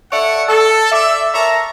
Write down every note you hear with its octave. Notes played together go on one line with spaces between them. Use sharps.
A4 C#5 D5 E5 F#5
A4
A4 D5 E5
A#4 C#5 E5 A5 A#5